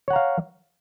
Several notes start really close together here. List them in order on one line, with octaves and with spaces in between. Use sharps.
C#5 F#5 A#5 F5